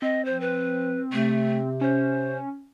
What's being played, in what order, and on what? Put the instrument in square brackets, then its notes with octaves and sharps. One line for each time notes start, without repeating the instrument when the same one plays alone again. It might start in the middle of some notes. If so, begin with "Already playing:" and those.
[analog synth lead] C4 [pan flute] D#5
[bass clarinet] F3 [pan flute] C5
[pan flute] B4
[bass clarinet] C3 [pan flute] A3
[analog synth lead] C#4 [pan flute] C5